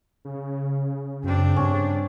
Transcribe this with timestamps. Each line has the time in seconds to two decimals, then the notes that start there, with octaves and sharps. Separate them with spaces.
0.25 C#3
1.24 F#2 C4 D4
1.56 G2 C#4